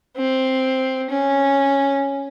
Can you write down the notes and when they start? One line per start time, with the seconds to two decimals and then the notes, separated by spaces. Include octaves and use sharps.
0.17 C4
1.10 C#4